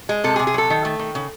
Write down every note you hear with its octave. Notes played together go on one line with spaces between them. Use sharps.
G#3
C3 A4
G#4
C3
G#4
F#3 A4
D#3
A3
D#3
C#3